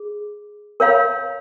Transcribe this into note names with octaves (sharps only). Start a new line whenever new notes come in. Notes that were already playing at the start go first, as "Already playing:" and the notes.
Already playing: G#4
A#4 C#5 F5 B5